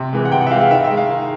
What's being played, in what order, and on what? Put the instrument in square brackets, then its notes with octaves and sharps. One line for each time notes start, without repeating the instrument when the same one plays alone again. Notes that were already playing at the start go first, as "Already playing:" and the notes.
Already playing: [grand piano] C3
E3 G#3
F#5
C3 G5
F#5
E5
E3 F5
G#3
F5
D#3 E5
E5
G#3
F5
D#3